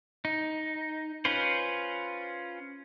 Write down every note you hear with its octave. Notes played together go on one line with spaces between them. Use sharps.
D#4
C#4 F4 B4 C5